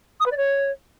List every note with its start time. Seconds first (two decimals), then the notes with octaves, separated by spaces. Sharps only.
0.20 D#6
0.25 B4
0.31 D5
0.37 C#5